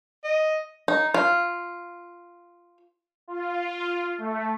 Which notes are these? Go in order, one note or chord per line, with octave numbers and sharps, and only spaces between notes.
D#5
D#4
F4
F4
A3